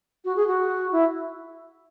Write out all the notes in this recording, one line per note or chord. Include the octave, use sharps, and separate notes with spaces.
F#4
G#4
F#4
E4